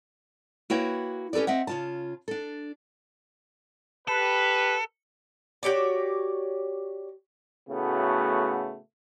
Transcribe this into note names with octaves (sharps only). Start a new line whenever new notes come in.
A#3 E4 F#4 B4 C#5 G5
C#4 G4 A4 B4 D5
C4 D#5 E5 F#5
C#3 F4 A5
D4 A4
G4 A4 B4
F#4 G4 C#5 D5
A2 C#3 A3 B3 F#4